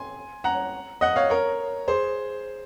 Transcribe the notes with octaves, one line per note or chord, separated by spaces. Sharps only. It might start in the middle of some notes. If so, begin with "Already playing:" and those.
Already playing: G#5 C6
F#5 A#5
D#5 F#5
C#5 F5
A#4 C#5
G#4 C5